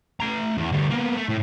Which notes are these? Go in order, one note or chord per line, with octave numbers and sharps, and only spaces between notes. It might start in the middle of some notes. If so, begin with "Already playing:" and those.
A3 A#5
E2
D2 G3
A#3 B3
A3
A2